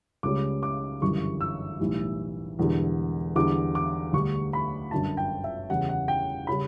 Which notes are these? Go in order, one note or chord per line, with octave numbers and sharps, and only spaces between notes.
C#2 C#3 G3 D6
D6
G1 F#2 E3 G3 C#6
E6
B1 A2 E3 G3
E1 E2 D3 G3
E2 D3 G3 D6
D6
D2 D3 G3 C#6
B5
G1 F#2 D3 F#3 A5
G5
E5
E2 C#3 E3 G3 F#5
F#5
G5
C#3 G3 B5